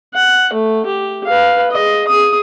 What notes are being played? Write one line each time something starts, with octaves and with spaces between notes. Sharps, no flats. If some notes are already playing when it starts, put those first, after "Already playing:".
F#5
A3
G4
B4 F5
G#4 D#5
G#4 D#6